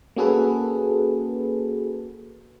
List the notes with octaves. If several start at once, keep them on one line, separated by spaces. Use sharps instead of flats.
A#3 C#4 F#4 G#4 A4 B4